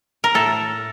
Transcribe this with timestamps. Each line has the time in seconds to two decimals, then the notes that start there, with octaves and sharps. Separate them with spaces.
0.24 A#4
0.34 A2 A4